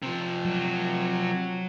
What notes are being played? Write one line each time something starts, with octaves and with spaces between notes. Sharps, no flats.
C3 F3
F#3